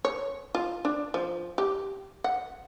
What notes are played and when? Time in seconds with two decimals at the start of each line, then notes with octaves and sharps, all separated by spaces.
0.05 C#5
0.55 F4
0.85 D4
1.14 F3
1.58 G4
2.24 F#5